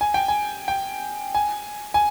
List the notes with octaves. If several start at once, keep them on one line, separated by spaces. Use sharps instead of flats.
G#5
G5
G#5
G5
G#5
G#5